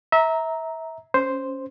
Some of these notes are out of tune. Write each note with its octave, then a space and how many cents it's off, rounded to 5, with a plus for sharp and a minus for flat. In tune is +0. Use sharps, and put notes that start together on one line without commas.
E5 -25 A#5 +0
C#4 +0 C5 +0